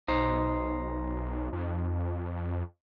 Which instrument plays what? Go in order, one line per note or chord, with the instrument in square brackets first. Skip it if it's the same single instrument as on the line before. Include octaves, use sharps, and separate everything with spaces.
[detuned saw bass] B1 [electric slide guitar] D#4 C5
[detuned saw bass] F2